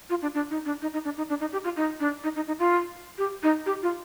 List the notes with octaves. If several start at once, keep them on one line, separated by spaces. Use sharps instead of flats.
F4
D4
D4
D#4
D4
D#4
D#4
D4
D#4
D4
D#4
G4
F4
D#4
D4
D#4
D#4
D#4
F4
G4
D#4
G4
F4